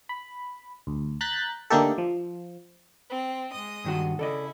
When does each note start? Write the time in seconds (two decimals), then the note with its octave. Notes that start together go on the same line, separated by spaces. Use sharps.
0.09 B5
0.87 D2
1.21 A#5 F#6 G6 A6 B6
1.70 D3 A3 A#3 D#4 G4 A4
1.98 F3
3.09 C4
3.51 G#3 D#5 D#6
3.85 G2 D#3 F#4
4.19 C#3 E4 A4 D5 D#5